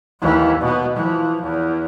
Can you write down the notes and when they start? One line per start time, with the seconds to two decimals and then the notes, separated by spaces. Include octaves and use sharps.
0.21 D#2 E3
0.61 B2 B3
0.96 E3 F3
1.42 E2